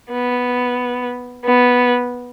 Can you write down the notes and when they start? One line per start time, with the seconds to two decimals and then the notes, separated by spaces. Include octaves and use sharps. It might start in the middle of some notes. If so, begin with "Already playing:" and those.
0.11 B3
1.44 B3